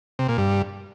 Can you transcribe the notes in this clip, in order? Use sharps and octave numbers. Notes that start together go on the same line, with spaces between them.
C3
A#2
G2